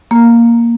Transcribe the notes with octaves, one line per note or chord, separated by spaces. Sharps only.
A#3